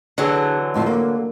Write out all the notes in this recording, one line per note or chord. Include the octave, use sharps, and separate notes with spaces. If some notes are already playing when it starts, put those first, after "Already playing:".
D3 E3 F#3 D4 G#4
F2 A2 F3
A#3